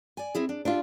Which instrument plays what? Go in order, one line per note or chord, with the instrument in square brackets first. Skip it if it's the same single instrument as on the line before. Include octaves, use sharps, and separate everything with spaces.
[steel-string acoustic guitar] D5 G#5
C4 E4 G#4
D4
[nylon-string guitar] D4 F4 [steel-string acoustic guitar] G4 E5